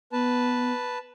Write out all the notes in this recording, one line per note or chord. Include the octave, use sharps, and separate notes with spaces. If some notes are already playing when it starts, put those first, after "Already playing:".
B3 B4 A5